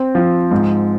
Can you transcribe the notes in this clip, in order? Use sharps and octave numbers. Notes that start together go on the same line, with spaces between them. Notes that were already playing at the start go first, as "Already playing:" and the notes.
Already playing: C4
F3
G#2